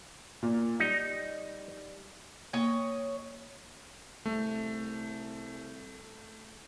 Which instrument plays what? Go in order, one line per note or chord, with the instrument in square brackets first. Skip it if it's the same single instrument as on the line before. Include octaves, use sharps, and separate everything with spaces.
[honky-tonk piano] A#2
[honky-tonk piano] G3 [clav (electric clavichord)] D#4
[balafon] A#3 [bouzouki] C#5 D#5
[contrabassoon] C2 [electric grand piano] A3